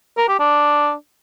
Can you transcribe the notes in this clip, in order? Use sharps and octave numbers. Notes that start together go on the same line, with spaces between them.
A#4
G4
D4